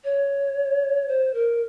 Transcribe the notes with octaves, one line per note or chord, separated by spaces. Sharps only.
C#5
C5
A#4